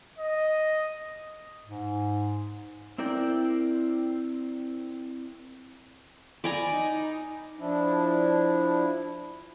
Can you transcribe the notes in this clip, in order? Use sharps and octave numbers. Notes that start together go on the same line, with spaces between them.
D#5
G#2
C4 E4 A#4 D5 G5
D5 G#5 A#5 B5
D#4
F3 D4 E4